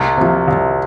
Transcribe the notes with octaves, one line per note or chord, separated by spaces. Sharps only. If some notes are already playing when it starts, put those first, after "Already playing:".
Already playing: C2
C3 F3
C2